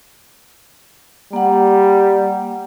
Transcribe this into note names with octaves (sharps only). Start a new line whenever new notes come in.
G3 A#3 F#5